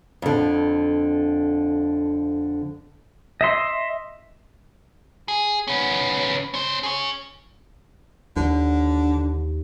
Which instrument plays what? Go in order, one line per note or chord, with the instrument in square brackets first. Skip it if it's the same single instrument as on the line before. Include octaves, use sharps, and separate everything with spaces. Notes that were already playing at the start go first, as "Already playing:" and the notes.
[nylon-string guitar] F2 D3
[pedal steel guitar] D#5 E5 C6
[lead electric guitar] G#4
B3 C#4
C#4 C5
G#4 C#5
[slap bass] D#2 [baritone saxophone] D3